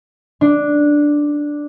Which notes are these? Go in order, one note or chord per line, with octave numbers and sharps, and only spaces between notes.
D4